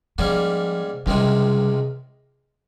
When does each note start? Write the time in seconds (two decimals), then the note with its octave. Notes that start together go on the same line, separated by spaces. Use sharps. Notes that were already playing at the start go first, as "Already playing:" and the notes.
0.18 G#2 F3 G3 A#3 C#4 G#4
1.06 C#2 C3 D#3 G3 G#3 C4